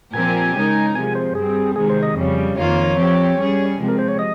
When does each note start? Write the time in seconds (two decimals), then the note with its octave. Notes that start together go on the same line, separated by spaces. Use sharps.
0.13 A#2 F3 C4 G4 A#4 G#5
0.54 C#3 G#3 D#4 A#4
0.95 C3 F3 G#3 G#5
1.15 C5
1.35 G2 G3 C4 G#4
1.76 C3 D#3 G#3 G#4
1.90 C5
2.03 D#5
2.16 F2 C#3 G3
2.56 F2 D#3 A#3 F4 C#5
2.97 F3 C4 G4
3.38 G3 C#4 G#4
3.78 C3 F3 G#3 C4
3.88 A#4
3.99 C5
4.08 C#5
4.19 D#5